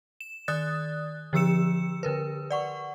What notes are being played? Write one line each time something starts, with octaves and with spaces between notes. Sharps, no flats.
E7
D#3 D5 D#6 F#6 A6
D3 F3 G4 E6 C#7 E7
D3 A#4 B4
D5 F#5 C#6